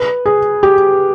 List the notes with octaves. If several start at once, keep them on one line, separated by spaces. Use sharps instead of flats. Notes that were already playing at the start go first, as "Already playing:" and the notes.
Already playing: B4
G#4
G4